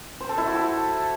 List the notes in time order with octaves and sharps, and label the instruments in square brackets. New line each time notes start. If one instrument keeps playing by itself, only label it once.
[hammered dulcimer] C5
A4
E4
F#4
A4